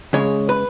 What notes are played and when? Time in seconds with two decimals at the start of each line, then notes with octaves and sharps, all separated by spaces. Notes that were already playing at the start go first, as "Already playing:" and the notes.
0.13 C#3 G#3 C#5
0.49 B4